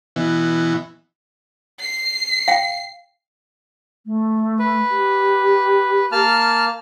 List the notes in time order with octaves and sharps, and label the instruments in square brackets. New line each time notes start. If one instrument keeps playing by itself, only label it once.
[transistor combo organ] B2 E3
[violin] C7
[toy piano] F5 G5
[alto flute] A3
[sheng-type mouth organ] B4
[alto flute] G4
[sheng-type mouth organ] A#3 A5 F6